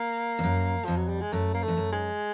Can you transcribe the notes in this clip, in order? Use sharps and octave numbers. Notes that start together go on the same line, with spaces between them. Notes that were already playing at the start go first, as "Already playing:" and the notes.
Already playing: A#3
F2
F#2
F2 F3
F#3
G3
G#3
F#2 A3
A#3
A3
F2
F#2
G#3